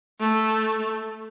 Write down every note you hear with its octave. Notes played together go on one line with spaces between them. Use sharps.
A3